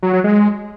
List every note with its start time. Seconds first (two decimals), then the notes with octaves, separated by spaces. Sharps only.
0.03 F#3
0.13 F#3
0.24 G#3